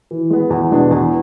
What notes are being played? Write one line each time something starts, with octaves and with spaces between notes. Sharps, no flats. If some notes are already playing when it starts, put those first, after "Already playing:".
E3
G#3 B3
E2
B2 G#3 B3 D4
E2